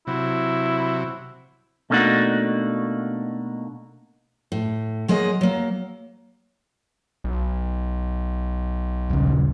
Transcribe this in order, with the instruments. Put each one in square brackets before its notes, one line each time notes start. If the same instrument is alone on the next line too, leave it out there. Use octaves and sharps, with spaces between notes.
[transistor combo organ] C3 F#3 [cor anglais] E4
[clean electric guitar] B2 A3 A#3 D4 D#4 F#4
[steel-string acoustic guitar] A2
F#3 G#3 A#3 D#5
F#3 A#3
[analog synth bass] B1
[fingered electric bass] D#1 C#3